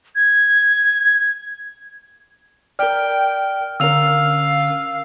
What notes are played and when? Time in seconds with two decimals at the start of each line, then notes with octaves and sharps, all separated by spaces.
0.16 G#6
2.79 A#4 D5 G5 F6
3.80 D3 C#4 A#4 F5 E6 F7